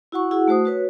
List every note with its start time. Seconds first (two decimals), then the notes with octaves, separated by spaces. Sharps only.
0.12 E4 F#4 F#5 C#6
0.31 E4 F#4 G#4 F#5
0.48 A3 F#4 C5 D#6
0.65 F#4 B4 C#5